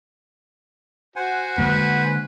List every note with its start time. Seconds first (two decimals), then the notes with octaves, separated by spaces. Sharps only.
1.16 F#4 C5 F#5 G#5
1.58 D3 G#3 A#3 B4